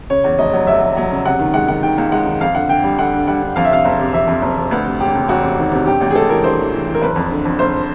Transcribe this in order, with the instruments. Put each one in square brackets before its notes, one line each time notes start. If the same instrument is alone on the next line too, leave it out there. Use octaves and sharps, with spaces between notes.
[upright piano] C#3 C#5
E2
F1 D#5
F#3
F1 E5
F1
F#3
C#3
C3 F#5
D#3
G#3 F#5
D#3 F#5
D#3 G5
C#2
G#3 F#5
D#3
F2 F5
D3 F#5
D3 G5
G3
D3 F#5
D3
G3 F#5
D3
F2 F5
E5
C3 F5
F#1
C3
F2 E5
F2
F#1
F2
D2 B4
C3
E1 G4
C3
E1 F#4
C3
D#3
C3
G2 G4
A1 G4
G#4
G#3 A4
E3 A#4
G2 C5
E3
E3
E3
A#4
F#1 B4
F2
D3
F2
F#1 C5